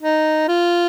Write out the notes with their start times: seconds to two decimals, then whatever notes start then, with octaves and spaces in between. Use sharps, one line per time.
0.01 D#4
0.48 F4